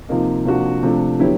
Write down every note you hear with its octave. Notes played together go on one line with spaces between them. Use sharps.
C3 F3 A#3 D#4
C3 F3 A#3 D4 F#4
C3 F3 A3 D4
D3 F#3 B3 E4 G4